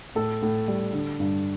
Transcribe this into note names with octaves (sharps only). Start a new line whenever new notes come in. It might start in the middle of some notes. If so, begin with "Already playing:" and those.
A2 A4
A2
G3
D3
G2